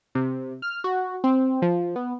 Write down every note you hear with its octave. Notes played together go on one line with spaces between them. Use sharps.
C3
F6
F#4
C4
F3
B3